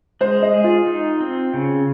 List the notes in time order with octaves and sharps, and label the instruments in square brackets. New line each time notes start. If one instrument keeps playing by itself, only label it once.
[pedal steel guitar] G#3 [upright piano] C5
[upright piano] D#5
[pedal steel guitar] G#4
[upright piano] F4
[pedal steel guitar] D#4
C4
C#3